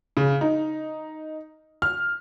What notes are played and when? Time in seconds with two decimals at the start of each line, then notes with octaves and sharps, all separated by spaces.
0.17 C#3
0.41 D#4
1.82 F6